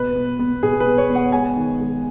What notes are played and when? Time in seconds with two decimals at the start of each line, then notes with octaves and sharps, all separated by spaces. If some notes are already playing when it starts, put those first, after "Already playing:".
Already playing: B2 B4
0.16 B3
0.39 B3
0.62 B2 G#4
0.80 B4
0.86 B3
0.98 C#5
1.09 B3
1.15 F#5
1.32 G#3 G#5
1.56 D#3
1.80 G#3